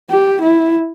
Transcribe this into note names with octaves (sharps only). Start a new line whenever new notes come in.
G4
E4